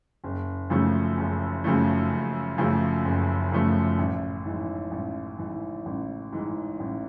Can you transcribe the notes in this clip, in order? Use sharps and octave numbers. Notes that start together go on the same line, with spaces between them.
F#1
F#2 C#3 F3 A3
F#1
F#2 C#3 F3 A3
F#1
F#2 C#3 F3 A3
F#1
F#2 C#3 F3 A3
A1
G#2 E3
A1
G#2 E3
A1
G#2 E3
A1